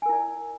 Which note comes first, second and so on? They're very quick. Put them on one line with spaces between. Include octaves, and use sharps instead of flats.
G#5 A#4 E4 D5